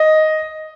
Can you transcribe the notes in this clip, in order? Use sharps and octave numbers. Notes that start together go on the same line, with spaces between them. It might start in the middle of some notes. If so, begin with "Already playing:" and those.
Already playing: D#5